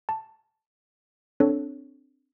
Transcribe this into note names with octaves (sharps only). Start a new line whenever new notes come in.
A5
C4 D4 A4 C#5